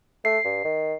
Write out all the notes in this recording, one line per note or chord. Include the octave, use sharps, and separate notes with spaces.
A3 C7
G2
D#3